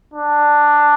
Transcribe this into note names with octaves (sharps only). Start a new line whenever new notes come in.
D4